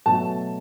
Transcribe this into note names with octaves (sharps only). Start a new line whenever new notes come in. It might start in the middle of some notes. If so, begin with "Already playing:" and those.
B2 F#3 A3 A5